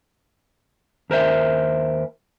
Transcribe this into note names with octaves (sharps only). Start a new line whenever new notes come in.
D#2 A#4 C5 E5